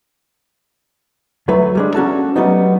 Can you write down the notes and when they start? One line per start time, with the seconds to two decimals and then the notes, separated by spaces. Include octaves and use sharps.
1.48 D2 F#3 A3 B4
1.75 G3 G#3 D4
1.94 A#3 C#4 F#4 A4
2.36 F#3 G3 A3 B3 D#4